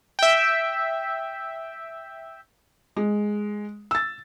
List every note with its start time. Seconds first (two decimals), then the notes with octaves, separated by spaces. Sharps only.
0.19 E5 G5
2.96 G#3
3.91 E6 A6